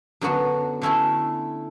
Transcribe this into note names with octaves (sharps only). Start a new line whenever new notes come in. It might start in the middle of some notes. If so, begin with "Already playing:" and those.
F#2 D3 F#3 B3 F#4
D3 A3 C#4 E4